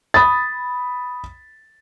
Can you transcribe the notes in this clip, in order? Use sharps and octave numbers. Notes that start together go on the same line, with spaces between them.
B5 D#6 A6